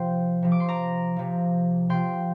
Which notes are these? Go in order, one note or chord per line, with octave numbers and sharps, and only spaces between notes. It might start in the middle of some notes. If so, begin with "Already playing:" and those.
Already playing: C3 F3 G5 C6
C3 F3
D6
C6
A#5 D6
C3 F3
C3 F3 G5 C6